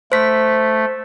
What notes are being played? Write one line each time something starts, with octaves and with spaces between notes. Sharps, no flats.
A3 C5 B6